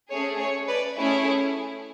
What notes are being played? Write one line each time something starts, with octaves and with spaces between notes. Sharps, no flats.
A3 C#4 G#4 C#5
C#5
B4 D5
A3 C#4 E4 G#4 C#5